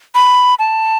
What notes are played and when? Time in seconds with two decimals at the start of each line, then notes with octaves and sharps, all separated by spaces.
0.15 B5
0.59 A5